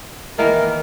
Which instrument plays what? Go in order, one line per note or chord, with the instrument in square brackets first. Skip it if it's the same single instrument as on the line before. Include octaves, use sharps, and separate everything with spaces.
[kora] D#3 E3 A#3 [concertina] A#4